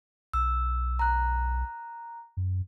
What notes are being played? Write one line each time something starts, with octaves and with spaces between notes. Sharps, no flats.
B1 E6
A#5 F#6
F#2